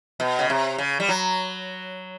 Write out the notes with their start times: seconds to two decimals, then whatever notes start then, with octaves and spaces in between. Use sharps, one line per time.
0.20 B2
0.39 C#3
0.50 C3
0.78 C#3
1.00 G3
1.09 F#3